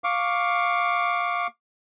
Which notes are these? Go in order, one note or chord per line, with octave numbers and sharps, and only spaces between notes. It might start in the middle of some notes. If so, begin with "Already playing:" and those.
F5 C#6 D6